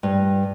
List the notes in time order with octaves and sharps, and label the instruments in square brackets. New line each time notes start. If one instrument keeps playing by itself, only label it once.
[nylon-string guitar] G2